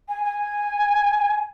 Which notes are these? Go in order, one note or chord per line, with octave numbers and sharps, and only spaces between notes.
G#5
G#5